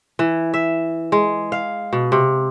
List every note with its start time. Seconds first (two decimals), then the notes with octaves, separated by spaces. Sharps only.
0.19 E3
0.54 E5
1.12 G#3
1.52 F5
1.93 B2
2.12 C3